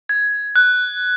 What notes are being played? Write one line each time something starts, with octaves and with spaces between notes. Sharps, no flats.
G#6
F#6